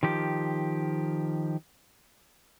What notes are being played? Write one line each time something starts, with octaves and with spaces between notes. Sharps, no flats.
D#3 F3 G4